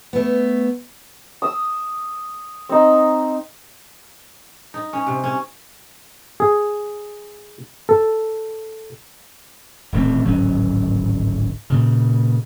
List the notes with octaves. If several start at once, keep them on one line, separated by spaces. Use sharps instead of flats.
A3 B3
D#6 E6
C4 D#4
D#4
C#4
C3
C#4
G#4
A4
D#1 A1 A3 C4
D1 G#1 F#3 C#4
A#2 C#3